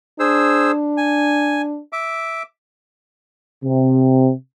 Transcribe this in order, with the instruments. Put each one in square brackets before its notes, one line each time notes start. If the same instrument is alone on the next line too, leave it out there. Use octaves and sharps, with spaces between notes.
[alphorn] D4 [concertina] G#4 C5 E6
[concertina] G#5
E5 D6
[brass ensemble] C3